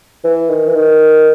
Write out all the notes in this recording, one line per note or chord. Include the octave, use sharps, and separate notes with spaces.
E3
D#3
E3
D#3